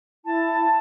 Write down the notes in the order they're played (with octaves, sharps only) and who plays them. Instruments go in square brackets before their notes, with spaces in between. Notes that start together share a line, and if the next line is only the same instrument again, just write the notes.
[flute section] E4 A5